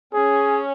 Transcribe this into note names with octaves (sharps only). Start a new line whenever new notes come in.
C#4 G#4